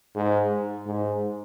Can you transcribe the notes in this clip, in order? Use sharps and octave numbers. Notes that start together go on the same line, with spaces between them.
G#2
G#2